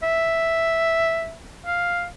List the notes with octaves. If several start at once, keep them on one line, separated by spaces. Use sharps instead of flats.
E5
F5